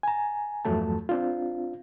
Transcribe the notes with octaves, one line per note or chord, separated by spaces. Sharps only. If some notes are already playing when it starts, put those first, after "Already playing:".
G#5 A#5
E2 G2 F3 F#3 A3 A5
C4 D4 F4